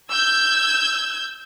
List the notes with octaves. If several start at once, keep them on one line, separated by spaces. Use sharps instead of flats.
E6 G6 G#6